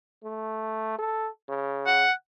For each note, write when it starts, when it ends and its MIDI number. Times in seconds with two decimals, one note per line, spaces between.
0.24 0.94 57
0.99 1.29 69
1.48 2.05 49
1.87 2.12 78